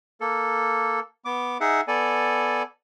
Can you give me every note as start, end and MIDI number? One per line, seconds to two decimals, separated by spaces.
0.21 1.00 58
0.21 1.00 69
1.25 1.58 59
1.25 1.58 86
1.60 1.81 63
1.60 1.81 68
1.60 1.81 76
1.60 1.81 78
1.88 2.63 59
1.88 2.63 69
1.88 2.63 74
1.88 2.63 80